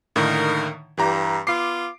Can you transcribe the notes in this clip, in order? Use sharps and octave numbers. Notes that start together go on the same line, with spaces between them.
A2 D3 D#3 A#3 D#4 A#4
G2 E3 G4 A#5
B3 F4 D6 C7